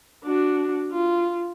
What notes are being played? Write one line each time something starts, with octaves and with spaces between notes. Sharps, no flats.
D4 F#4
F4